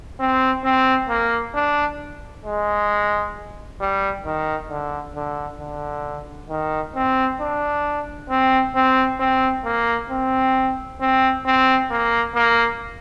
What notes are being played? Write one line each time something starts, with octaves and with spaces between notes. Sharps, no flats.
C4
C4
A#3
D4
G#3
G3
D#3
D3
D3
D3
D#3
C4
D4
C4
C4
C4
A#3
C4
C4
C4
A#3
A#3